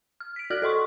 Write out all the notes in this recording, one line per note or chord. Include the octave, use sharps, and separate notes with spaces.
F6
B6 D7
F#4 D5 F6 F#6 F#7
A4 D#5 C6 C#6